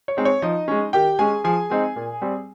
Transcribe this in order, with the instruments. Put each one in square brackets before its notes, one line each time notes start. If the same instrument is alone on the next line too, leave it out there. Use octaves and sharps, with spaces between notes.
[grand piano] C#5
G#3 C4 D#4
C#5
F3 D#4 D#5
G#3 C#4
D#3 G4 G5
G#3 C#4 G#4 G#5
F3 G#4 G#5
G#3 C4 D#4
A#2
G3 C4